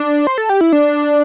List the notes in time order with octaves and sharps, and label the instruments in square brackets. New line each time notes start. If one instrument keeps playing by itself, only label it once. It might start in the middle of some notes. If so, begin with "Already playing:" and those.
Already playing: [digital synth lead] D4
C5
A4
G4
E4
D4